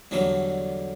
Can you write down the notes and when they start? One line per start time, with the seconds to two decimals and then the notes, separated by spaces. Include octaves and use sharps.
0.11 E2 D3 F#3 G3 A3 A#5